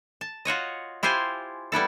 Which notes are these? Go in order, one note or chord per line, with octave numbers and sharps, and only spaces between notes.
A5
F4 F#4 C#5 D#5
E4 F4 G4 C5 G#5
G3 B3 E4 A4